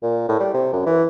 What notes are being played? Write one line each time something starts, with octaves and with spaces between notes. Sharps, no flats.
A#2
A2
G3
C3
F#2
E3